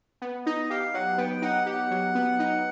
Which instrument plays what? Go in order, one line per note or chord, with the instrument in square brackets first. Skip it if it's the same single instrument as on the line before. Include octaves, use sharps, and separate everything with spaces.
[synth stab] B3
[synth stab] D#4 [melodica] D#5
[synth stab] G4 [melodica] F5
[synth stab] F#3 [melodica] F#5
[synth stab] B3 [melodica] G5
[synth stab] D#4 [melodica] F#5
[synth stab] G4 [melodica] F#5
[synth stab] F#3
B3
D#4